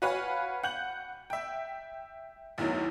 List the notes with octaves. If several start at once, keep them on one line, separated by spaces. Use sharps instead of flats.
F#4 B4 C#5 F5 F#5 G#5
F#5 F#6 G6 F#7
E5 G5
A1 E2 A2 D#3 F#3